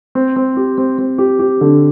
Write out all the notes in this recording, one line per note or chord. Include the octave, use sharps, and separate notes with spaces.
C4
C4
G4
C4
C4
G4
G4
D3